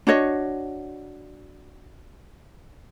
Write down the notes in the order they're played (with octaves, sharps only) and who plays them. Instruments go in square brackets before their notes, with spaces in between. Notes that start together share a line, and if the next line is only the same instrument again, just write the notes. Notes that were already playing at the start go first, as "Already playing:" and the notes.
[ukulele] D4 F#4 C#5 D#5